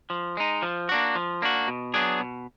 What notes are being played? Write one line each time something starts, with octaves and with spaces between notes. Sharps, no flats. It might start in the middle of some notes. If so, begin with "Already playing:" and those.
F3
G#3 D#4
F3
A#3 D4 F#4
F3
A#3 D4 F#4
B2
F#3 B3 D4 G#4
B2